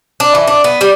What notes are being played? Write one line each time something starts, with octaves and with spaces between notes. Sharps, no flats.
D4
E3
D4
B3
G3